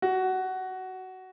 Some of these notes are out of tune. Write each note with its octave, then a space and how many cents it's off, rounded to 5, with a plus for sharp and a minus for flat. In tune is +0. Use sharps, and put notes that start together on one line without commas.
F#4 +15